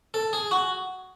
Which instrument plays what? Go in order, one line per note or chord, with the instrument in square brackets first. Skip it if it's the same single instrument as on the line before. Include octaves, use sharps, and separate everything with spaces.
[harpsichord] A4
G#4
F#4